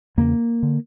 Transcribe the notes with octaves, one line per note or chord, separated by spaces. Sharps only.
E2 C#3 A#3
D3